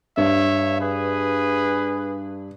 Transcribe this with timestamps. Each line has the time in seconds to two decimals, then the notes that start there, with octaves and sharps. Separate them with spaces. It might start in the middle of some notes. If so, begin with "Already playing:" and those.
0.17 G2 C#5 E5
0.80 G#4 B4